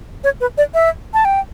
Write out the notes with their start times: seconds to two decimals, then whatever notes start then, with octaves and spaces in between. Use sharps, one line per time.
0.24 C#5
0.41 B4
0.58 D5
0.74 E5
1.14 A5
1.25 G5